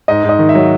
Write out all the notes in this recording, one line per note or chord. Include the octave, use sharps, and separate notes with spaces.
G#2 D#5
G#2
D#5
D#3
E5
F#3